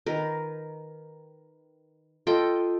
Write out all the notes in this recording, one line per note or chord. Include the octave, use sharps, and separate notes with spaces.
D#3 A#4 B4
F4 A4 D#5 G5